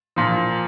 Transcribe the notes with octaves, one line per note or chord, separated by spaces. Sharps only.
A#2 F3